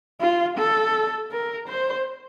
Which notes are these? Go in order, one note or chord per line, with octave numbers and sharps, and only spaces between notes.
F4
A4
A#4
C5